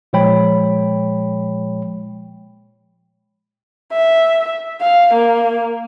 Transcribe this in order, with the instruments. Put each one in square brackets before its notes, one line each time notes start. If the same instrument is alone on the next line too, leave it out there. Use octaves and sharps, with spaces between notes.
[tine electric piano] A#2 F3 G#3 C#5 G5 B5
[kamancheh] E5
F5
A#3